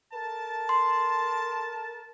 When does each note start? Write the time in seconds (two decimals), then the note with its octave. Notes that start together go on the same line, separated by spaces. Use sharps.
0.13 A4 A#4 A5
0.69 C6